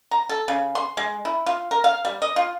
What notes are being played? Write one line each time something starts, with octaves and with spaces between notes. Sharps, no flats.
A#5
A4
C#3
C6
G#3
E4
F4
A#4
F5
G3
D#5
F4